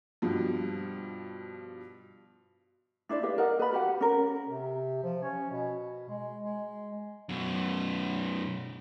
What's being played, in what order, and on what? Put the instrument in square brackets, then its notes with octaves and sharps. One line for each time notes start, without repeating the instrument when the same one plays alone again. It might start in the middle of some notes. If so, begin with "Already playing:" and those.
[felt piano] G2 B2 F3
[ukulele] D4 E4 C5 D5
G4 B4 D#5 F5
A#4 D#5 F#5
B4 B5
F#4 G4 F#5
C#4 A#4
[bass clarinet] C3
F3
C#4
B2
G#3
G#3
[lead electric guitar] F#2 B2